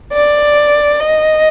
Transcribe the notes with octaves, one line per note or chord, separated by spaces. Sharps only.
D5
D#5